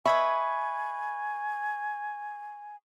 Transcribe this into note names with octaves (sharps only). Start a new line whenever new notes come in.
B4 D#5 E5 G#5 B5 C#6 G#6